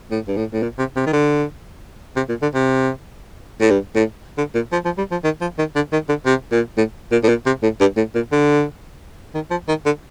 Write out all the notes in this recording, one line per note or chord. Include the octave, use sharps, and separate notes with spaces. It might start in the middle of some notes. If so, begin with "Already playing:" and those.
A2
G2
A2
A2
A#2
C3
C3
D#3
D3
C3
A#2
D3
C3
A2
G2
A2
D3
A#2
F3
F3
G3
F3
D#3
F3
D#3
D3
D#3
D3
C3
A#2
A2
A#2
A2
A#2
C3
A2
G2
A2
A#2
D3
D#3
F3
D#3
D3